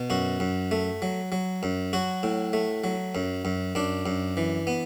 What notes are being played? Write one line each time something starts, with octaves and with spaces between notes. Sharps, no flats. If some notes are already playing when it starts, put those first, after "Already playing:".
Already playing: B2
F#2 F#4
F#2
A3
F#3
F#3
F#2
F#3 F#4
A2
A3
F#3
F#2
F#2
F#2 D4
F#2
E3
B3